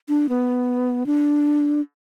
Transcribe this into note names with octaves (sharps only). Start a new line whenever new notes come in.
D4
B3
D4